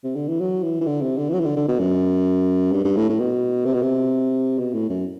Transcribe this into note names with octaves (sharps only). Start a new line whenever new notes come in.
C3
D3
E3
F#3
E3
E3
D3
C3
D3
E3
F#3
E3
D3
D3
B2
F#2
G2
G2
A2
A2
B2
C3
B2
C3
B2
A2
F#2